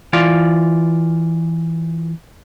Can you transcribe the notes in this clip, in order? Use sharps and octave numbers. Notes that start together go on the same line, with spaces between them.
E3 F4 D5 F5